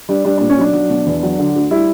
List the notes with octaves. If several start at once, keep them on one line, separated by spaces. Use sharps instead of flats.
G3 D4
G3 D4
A#2 D4
C#4
B1 D4
F#3
B2
E2
F#3
D3
D2
G3 E4